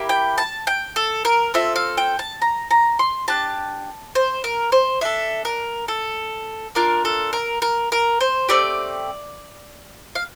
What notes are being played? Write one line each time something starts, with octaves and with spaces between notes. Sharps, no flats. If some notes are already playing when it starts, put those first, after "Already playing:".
Already playing: A#3 E4 G4
G5
A5
G5
A4
A#4
C4 F4 A4 E5
F5
G5
A5
A#5
A#5
C6
D4 G4 A5
C5
A#4
C5
D4 A4 E5
A#4
A4
A#3 D4 F4 A#4
A4
A#4
A#4
A#4
C5
A3 C4 G4 D5
F5